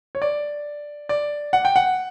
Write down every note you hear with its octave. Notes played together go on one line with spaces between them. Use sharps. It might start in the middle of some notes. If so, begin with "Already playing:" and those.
C#5
D5
D5
F#5
G5
F#5